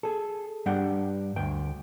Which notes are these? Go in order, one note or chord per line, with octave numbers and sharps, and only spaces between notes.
G#4 A4
G2 G3 D4 F#5 G5
D2 G5